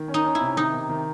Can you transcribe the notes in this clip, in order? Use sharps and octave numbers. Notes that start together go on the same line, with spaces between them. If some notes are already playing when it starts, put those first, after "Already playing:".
Already playing: D#3
C#4
D#4
C#4
E4
C3
D#3 D#4
C3
D#3